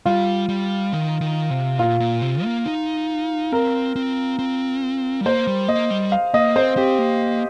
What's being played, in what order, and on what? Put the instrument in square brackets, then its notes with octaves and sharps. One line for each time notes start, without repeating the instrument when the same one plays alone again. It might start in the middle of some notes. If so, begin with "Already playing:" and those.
[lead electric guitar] G3 [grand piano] F4
[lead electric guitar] G3
D#3
D#3
C3
[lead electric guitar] A#2 [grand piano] F4
[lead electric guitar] A#2
C3
A#3
D#4
[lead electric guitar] C4 [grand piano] A#4
[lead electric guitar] C4
C4
G3
[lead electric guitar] A#3 [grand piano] C5
[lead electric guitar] G3
[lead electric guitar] A#3 [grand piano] D#5
[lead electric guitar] G3
[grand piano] F5
[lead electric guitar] A#3 [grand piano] D#5
[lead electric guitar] C4 [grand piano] C5
[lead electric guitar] C4 [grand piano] G4
[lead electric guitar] A#3